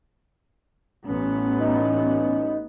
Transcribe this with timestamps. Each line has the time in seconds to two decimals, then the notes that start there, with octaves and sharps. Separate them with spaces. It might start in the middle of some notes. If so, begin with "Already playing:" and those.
1.07 A1 B3 C#4
1.59 D#4